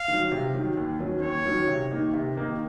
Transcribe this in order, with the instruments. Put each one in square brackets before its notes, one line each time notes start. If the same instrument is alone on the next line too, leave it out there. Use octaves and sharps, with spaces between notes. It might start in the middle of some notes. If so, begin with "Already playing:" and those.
Already playing: [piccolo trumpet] F5
[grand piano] D#3 F#3
C3
D#3 F#3
D#2
D#3 F#3 C#4
[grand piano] D#2 [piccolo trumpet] C#5
[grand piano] D#3 F#3 C#4
C3
D#3 A#3 D#4
C3
D#3 A#3 D#4